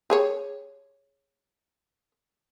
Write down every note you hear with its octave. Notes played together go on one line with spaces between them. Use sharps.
G4 G#4 C#5